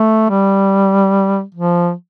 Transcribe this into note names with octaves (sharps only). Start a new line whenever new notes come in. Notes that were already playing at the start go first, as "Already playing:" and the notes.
Already playing: A3
G3
F3